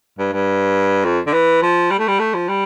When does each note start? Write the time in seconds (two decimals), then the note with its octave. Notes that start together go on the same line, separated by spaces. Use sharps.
0.18 G2
0.33 G2
1.04 F2
1.27 D3
1.33 E3
1.62 F3
1.91 G3
1.99 A3
2.08 G3
2.19 A3
2.34 F3
2.48 G3